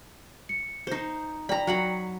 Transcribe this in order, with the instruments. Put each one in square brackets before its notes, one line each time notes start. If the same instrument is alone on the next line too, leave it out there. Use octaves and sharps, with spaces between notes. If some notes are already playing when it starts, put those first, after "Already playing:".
[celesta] C#7
[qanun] D#4 C5
[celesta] D5 G5 [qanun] A#5 B5
[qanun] F#3 F#5 B5